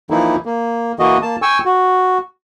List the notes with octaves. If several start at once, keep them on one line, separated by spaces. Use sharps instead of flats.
E3 F3 A#3 D#4 E4
A#3
E3 A#3 F#4 D#5
A#3 A5
G5 G#5 C#6 E6
F#4